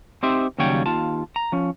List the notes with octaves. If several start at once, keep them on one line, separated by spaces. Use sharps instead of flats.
C4 D#4 G4 C5 E5
D#2 C#3 F#3 G3 C#5 G5
D#2 F4 A5
A#5
F3 C#4